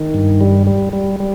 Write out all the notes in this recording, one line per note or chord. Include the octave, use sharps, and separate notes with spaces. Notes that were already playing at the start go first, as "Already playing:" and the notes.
Already playing: D#3
G2
G3
G3
G3
G3